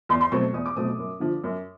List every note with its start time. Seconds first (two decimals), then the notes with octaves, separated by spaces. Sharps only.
0.09 E2 C6
0.21 C6
0.32 B2 F#3 A3 C4 C#6
0.54 E2 D#6
0.66 D6
0.76 B2 F#3 A3 C4 D#6
0.88 D#6
0.99 F#2
1.20 D3 F3
1.44 F#2